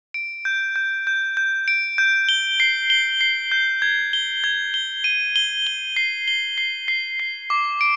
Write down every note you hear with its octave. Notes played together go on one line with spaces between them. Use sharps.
D7
G6
G6
G6
G6
D7
G6
G7
C7
G7
C7
G6
G#6
G7
G#6
G7
D#7
G7
G7
C7
G7
C7
C7
C7
D6
D7